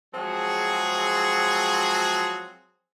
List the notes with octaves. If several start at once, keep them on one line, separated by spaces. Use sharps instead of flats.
F3 F#3 G#3 C4 F#4 G#4